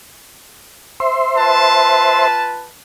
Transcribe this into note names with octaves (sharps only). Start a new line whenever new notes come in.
C5 E5 C6
F4 B4 A5